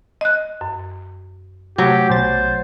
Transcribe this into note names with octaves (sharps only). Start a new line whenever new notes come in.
D#5 F#6
F#2
C3 F#3 A3 G4
B1 C5 A6